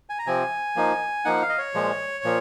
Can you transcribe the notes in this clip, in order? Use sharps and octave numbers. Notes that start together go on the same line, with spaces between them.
G#5
A#5
C3 F3 C4 G#5
F3 A#3 D#4
F3 A#3 D#4 F#5
F5
D#5
C#5
A#2 F3 G#3
A#2 F3